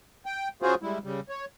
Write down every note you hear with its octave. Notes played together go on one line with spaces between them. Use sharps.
G5
C#3 F4 F#4 G#4 C5
G3 G#3 E4
C#3 G3
C#5